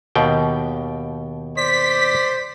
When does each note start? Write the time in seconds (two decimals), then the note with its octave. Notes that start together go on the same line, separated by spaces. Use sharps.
0.15 D#2 B2 G5
1.57 C5 D5 B6